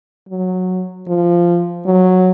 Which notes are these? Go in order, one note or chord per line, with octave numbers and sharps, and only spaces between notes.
F#3
F3
F#3